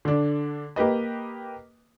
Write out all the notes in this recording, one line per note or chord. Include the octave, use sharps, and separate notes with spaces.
D3 D4
A#3 G4 B4 D#5